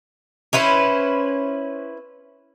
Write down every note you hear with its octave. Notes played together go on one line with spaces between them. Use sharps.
C#4 E4 B4 C5